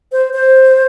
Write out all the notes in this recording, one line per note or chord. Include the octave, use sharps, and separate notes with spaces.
C5
C5